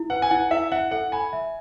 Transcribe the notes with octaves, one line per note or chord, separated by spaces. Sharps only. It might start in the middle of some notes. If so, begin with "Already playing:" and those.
Already playing: E4
B4 F#5
G#5
E4 F#5
E4 E5
E5 F#5
A4 F#5
G#5 B5
E5